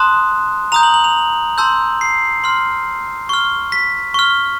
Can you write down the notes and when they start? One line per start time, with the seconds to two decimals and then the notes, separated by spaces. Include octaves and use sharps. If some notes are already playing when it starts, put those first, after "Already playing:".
Already playing: A5 C6 D#6 F#6 E7
0.72 A#5 D#6 G6 F7
0.83 F#7
0.94 F#7
1.04 F7
1.58 A5 C6 E6 G6
2.01 C7
2.44 C6 F6
3.29 C#6 F6
3.72 B6
4.14 C#6 F6